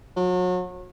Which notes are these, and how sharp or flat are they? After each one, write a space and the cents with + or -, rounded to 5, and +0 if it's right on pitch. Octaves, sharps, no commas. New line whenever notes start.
F#3 -35